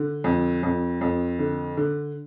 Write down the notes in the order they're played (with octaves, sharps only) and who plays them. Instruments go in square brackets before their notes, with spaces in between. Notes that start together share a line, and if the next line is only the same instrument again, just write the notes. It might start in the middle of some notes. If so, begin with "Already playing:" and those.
Already playing: [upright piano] D3
F2
F2
F2
D3
D3